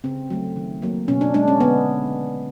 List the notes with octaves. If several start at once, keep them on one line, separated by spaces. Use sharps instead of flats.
C#3 C4
F#3 A3
D#3
F#3 A#3
B2 C#4
D4
G#3 D4
C#4
D3 B3